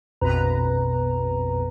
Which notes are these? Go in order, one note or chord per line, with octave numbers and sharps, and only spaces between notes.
A#1 F2 B2 B4 A#5